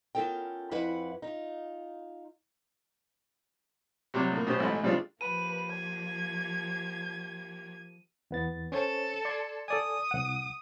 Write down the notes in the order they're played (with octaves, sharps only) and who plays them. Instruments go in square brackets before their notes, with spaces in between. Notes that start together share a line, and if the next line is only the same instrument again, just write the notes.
[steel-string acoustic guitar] B3 C#4 F4 A4 A#4 G5
F2 E4 B4 E5 F#5
D#4 F4
[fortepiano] C3 F#3 G3 D6
A2 A#3
B2 C#4 G4 C5
A1 G#2 A3 D#5 B5
C#3 G3 G#3 C4 D4 F4
[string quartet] F3 A#3 G4 [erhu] B4 [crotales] D#7
[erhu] G#6
[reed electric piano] E2 B3 A6
[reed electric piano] C#4 C5 C#5 [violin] A4
[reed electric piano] D5 C6 G#6
[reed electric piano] A4 D5 G#5 [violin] D#6
[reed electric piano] C2 F#5